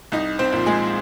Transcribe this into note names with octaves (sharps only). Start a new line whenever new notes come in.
C2 D#4
C4 C5
A#2 F3
G#3 G#4